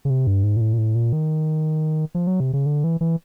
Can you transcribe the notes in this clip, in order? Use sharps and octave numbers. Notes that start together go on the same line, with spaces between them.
C#3
C3
G2
G#2
A#2
A2
A#2
A2
A#2
D#3
F3
F#3
C3
C#3
D3
E3
E3